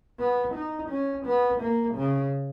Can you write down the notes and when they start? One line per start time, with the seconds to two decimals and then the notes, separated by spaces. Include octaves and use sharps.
0.19 B3
0.55 D#4
0.89 C#4
1.26 B3
1.61 A#3
1.95 C#3